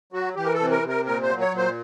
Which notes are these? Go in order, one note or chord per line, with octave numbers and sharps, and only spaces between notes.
F#3 F#4
E3 G4
A#4
A4
C3
A#4
C3
A#4
A#2 A#4
C5
F#3
C#5
A#2
C5